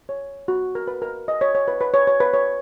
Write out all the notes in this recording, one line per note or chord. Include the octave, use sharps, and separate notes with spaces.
C#5
F#4
A#4
B4
A#4
D#5
C#5
C#5
B4
B4
C#5
C#5
B4
C#5